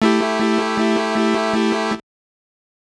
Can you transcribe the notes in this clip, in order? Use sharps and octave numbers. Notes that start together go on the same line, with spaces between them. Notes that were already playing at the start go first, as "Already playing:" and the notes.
A3 E4 G4